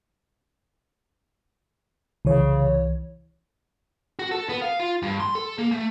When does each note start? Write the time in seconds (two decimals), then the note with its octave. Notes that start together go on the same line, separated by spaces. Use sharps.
2.25 C2 C#3 E3 C#5
4.19 F#4
4.31 A4
4.49 B3
4.62 F5
4.80 F4
5.02 G2
5.20 C6
5.35 A4
5.58 A#3
5.72 A3